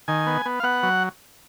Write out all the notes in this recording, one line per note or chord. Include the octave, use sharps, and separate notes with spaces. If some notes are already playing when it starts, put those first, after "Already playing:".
D#3 G#5
B3
B3
F5
B3 F#5
F#3